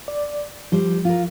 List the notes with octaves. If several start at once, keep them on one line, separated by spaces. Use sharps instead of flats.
D5
F3 G3 C5
F4 A#4